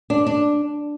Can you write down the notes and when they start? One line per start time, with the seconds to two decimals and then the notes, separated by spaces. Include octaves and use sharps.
0.10 D4
0.27 D4